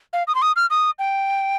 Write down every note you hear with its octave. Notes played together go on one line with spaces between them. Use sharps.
F5
D#6
C6
D#6
F6
D#6
G5